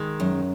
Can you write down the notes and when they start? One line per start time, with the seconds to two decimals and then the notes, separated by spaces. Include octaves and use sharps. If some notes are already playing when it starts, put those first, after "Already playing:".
Already playing: D#3 G#3
0.20 F#2